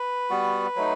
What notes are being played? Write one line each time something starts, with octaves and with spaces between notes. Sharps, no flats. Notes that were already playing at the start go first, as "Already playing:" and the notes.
Already playing: B4
G3 B3 F#4
F#3 A3 D#4